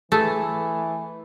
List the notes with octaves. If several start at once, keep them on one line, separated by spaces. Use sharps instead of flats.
E3 A3 G#4 A4